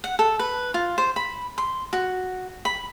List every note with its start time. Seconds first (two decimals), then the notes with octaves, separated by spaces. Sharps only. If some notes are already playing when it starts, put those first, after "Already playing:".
0.04 F#5
0.19 A4
0.39 B4
0.74 F4
0.98 C5
1.16 B5
1.58 C6
1.93 F#4
2.65 B5